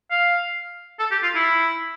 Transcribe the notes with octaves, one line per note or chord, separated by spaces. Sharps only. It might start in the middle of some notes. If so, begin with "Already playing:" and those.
F5
A4
G4
F4
E4